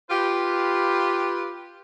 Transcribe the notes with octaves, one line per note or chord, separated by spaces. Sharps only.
F4 G4 B4